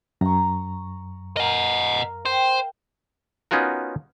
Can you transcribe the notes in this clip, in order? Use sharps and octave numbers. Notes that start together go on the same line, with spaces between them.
F#2 A#5 C#6
A#4 D#5 F5 F#5
C5 G5
B3 C#4 D#4 F4 F#4 A#4